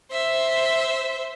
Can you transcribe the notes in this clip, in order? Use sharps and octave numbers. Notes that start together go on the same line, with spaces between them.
C5 E5